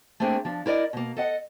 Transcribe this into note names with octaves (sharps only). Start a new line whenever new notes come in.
A3 A#3 C4 D4 G#4
F3 D4
E4 A#4 D5 D#5
B2 A#3
A4 D#5 F#5